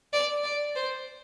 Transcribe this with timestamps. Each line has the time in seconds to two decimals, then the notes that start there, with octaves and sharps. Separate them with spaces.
0.13 D5
0.44 D5
0.76 C5